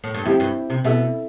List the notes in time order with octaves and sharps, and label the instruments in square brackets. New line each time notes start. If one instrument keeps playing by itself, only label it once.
[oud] A2
G2
[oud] F2 [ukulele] E4 G4 C5 G5
[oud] G2
C3
[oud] B2 [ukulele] E4 A4 E5